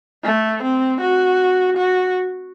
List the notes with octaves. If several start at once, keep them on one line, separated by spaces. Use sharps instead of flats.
A3
C4
F#4
F#4